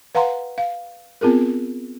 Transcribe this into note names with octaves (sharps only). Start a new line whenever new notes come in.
B4 F5 F#5 A#5 C6
F5
B3 C4 F4 G#4 A#4